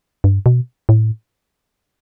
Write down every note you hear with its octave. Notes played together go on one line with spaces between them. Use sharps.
G2
B2
A2